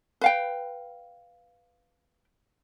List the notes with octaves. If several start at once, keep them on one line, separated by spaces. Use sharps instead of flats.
B4 F5 G5